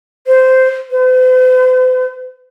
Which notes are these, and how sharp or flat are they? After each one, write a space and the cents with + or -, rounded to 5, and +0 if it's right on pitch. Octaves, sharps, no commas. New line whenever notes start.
C5 -10
C5 -45